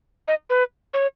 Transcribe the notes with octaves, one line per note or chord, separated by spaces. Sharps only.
D#5
B4
C#5